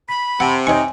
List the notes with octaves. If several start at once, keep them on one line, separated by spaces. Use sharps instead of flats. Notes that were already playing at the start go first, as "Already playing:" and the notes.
B5 B6
C3 F#5 A5 E6
D#4 C#5 G#5 C#6